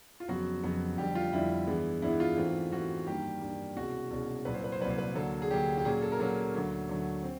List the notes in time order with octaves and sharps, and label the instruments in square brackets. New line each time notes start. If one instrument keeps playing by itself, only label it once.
[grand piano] F4
F2 C#3 F#3 B3 F#4
F2 C#3 F#3 B3
F2 D3 G3 G4
F4
F2 D3 G3 E4
G2 E3 G#3 B3
G2 E3 G#3 B3 E4
F4
G#2 E3 A3 C4
G#2 E3 A3 C4 F#4
G2 D#3 G3 A#3 G4
G2 D#3 G3 A#3
C2 B2 G#3 C#4 F#4
C2 B2 G#3 C#4
C2 A#2 F#3 B4
C5
B4
C5
C2 A#2 F#3 B4
C5
B4
D2 D3 F#3 A#3 A4
G#4
D2 D3 F#3 A#3 G4
G4
A#2 F#3 A#3 C#4 G#4
A4
A#4
A#2 F#3 A#3 C#4 A4
D2 D3 F#3 A3
D2 D3 F#3 A3
C4